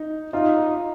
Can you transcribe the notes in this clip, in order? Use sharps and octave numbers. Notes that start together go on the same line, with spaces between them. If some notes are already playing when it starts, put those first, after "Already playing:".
Already playing: D#4
D#4 F4